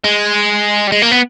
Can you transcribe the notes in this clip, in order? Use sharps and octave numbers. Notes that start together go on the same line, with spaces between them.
G#3
G3
G#3
A#3
B3